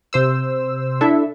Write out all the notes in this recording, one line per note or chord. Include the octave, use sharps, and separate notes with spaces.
C3 C5 E6
D4 E4 A4 E5